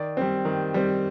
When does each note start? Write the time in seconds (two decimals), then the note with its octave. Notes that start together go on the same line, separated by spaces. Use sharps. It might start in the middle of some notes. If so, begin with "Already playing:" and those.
Already playing: D#3 D5
0.17 G3 C4
0.45 D#3
0.74 G3 C4